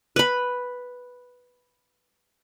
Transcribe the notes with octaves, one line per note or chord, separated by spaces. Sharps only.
B4 B5